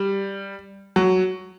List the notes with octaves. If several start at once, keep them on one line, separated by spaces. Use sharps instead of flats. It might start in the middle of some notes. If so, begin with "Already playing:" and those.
Already playing: G3
F#3